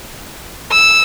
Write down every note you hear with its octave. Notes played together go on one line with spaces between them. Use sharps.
E6